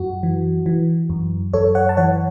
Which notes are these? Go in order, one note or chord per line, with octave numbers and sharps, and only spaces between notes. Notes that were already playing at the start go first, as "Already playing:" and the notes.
Already playing: F#2 F#4
E3
E3
F#2
F#2 A4 C#5
C#5 F#5
A5
E3 C#5 F#5